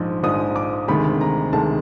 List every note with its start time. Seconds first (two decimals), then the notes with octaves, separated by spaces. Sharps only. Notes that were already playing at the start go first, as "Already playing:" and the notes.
Already playing: A#1 G#2 F3
0.23 A#1 G#2 F3 D#6
0.56 D6
0.88 D2 C3 D#3 G#3 B5
1.21 A#5
1.53 D2 C3 D#3 G#3 A5